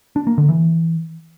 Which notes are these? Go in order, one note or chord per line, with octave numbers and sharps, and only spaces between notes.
D4
A#3
D3
E3